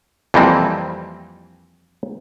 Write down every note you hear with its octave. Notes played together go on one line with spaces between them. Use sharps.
F2 E3 G3 A#3 C4